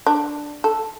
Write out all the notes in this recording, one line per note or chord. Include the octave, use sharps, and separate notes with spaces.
D4
A4